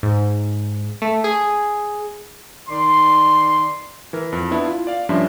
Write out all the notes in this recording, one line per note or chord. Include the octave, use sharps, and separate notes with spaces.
G#2
A3
G#4
D#3 D5 C6
E3 A#4
F2
B3 D4 E4
F4
D5 F5
G2 F3 C#4 D4 E5 C6